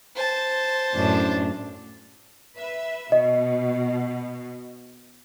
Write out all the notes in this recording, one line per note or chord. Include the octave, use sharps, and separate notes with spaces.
C5 A5
F#2 A2 D4
B4 E5
B2 D#5